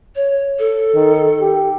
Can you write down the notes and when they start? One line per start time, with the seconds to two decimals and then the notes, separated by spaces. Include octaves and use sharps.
0.15 C#5
0.58 A4
0.94 D#3
1.41 G4